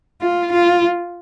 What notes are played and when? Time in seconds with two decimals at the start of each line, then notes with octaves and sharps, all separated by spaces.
0.22 F4
0.52 F4